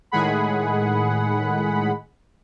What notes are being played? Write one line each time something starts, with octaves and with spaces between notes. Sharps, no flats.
A2 D#3 G#3 G#4 F#5 B5